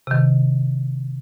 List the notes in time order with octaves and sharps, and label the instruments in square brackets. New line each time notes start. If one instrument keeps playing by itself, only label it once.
[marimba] C3 D#3